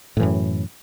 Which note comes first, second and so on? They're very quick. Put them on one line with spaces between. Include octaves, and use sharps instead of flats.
A2 E3 F#2